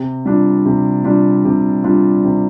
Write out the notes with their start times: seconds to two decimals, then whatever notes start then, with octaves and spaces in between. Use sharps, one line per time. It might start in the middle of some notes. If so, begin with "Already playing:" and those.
Already playing: C3
0.26 G3 D4 F4
0.66 C3
1.04 G3 D4 F4
1.45 C3
1.84 G3 D4 F4
2.24 C3